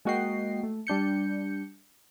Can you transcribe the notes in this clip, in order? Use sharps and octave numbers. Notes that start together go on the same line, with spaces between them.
G#3 A#3 F#4 D#5 G5 C7
A3
G3 D4 G6 C#7